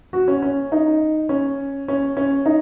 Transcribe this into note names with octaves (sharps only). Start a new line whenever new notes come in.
F#4
C#4
C#4
D#4
C#4
C#4
C#4
D#4